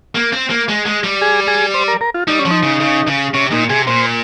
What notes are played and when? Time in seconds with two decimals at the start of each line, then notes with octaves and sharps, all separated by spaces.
0.15 A#3
0.33 C4
0.50 A#3
0.69 G#3
0.86 G#3
1.04 G3
1.21 G#4
1.48 G#4
1.74 C5
1.88 A#4
2.01 A#4
2.14 F4
2.28 G3 D#4
2.39 C#4
2.45 F3
2.51 D#4
2.63 C#3
2.80 C#3
3.07 C#3
3.34 C3 C#4
3.51 A#2 D#4
3.70 C3 G#4
3.87 A#2 C5